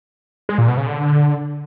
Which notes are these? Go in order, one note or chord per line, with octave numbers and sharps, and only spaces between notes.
G#3
A#2
B2
C#3
D3